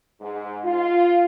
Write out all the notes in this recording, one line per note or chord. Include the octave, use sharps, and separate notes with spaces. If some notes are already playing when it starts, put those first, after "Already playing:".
G#2
F4